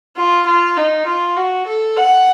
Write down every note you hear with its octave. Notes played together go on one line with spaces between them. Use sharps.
F4
F4
D#4
F4
F#4
A4
F#5